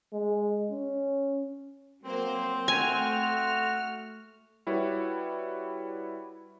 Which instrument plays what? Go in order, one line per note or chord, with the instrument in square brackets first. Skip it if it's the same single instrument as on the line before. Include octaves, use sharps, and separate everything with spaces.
[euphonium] G#3
C#4
[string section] F#3 A#3 C5 [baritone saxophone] C4
[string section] A3 F6 [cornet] F#4 [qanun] G#5
[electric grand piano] G3 E4 F#4 B4 C#5